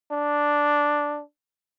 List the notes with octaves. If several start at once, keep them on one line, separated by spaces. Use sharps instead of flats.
D4